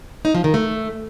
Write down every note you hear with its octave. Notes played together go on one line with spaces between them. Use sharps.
D#4
F3
D#3
A3